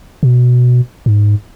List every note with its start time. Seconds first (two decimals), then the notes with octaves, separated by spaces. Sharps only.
0.23 B2
1.06 G#2